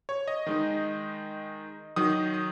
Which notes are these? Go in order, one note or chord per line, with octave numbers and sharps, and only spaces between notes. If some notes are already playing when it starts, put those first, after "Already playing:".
C#5
D#5
D#3 G#3 D#4
D#3 F#3 D#4 D#6
D#6